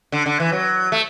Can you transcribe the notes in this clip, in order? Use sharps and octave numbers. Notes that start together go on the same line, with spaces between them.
D3
D3
E3
F#3
A3